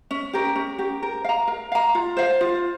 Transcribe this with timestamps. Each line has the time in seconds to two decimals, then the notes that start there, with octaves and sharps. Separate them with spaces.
0.11 C#4
0.33 G4 A#4
0.55 C#4
0.78 G4 A#4
1.03 A#4
1.24 F5 A#5
1.47 A#4
1.72 F5 A#5
1.95 F4
2.17 C5 F5
2.41 F4